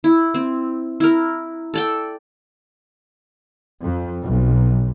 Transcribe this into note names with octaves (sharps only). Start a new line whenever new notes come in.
E4
C4
E4 A#4
A4 D5 G5
F2
B1